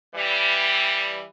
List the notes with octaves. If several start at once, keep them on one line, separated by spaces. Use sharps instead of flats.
E3 G3